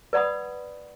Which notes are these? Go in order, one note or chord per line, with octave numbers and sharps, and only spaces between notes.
B4 D5 F#5 B5 D#6